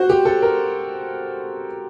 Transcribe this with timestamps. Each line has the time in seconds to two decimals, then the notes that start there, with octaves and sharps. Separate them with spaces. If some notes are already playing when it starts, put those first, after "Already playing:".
Already playing: F#4 C5
0.10 G4
0.25 A4
0.42 A#4